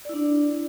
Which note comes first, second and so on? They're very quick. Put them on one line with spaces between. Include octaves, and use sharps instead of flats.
D5 E4 D4